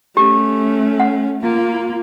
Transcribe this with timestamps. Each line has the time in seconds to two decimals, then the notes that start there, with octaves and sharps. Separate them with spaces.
0.17 A3 C#4 G4
1.00 F#5
1.42 A#3 F4